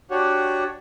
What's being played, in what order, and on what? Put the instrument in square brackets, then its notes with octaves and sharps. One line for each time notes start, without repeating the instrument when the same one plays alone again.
[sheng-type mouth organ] D4 F#4 G4 C#5 F#5